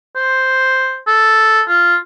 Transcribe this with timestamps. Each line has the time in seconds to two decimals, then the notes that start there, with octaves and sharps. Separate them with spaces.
0.16 C5
1.07 A4
1.68 F4